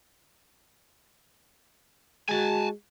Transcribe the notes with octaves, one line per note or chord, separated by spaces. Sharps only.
G#3 F#4 G#5 A5